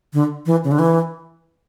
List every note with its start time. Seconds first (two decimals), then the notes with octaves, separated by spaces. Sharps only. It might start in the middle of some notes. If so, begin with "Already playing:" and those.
0.13 D3
0.46 E3
0.64 C#3
0.71 D3
0.79 E3